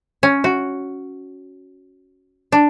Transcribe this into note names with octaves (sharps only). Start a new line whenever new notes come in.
C#4
F#4
D4